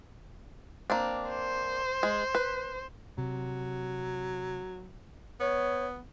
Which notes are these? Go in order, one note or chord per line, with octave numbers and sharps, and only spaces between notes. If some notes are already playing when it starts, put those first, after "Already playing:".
A#3 C4 D4
C5
G#3
B4
C3 F#3
B3 C#5